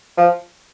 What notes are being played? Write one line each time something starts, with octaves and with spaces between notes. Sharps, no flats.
F3